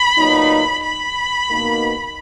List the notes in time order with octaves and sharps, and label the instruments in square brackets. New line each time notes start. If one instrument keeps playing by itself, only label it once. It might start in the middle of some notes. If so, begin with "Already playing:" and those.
Already playing: [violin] B5
[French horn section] A#2 F#3 B3 D#4
[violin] B5
[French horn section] B2 A#3 D#4